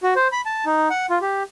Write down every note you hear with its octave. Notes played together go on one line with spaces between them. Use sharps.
F#4
C5
B5
A5
D#4
F#5
F4
G4